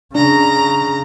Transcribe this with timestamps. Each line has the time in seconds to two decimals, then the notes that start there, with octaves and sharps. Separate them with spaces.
0.15 C#3 D4 A#5